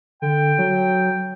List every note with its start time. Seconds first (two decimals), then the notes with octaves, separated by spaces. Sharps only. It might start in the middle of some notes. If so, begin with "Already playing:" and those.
0.22 D3 G5
0.58 F#3